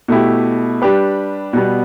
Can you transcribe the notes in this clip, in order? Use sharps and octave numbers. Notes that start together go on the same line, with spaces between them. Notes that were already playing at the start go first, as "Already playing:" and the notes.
B2 A3 E4 G4
G3 D4 G4 B4
B2 G3 B3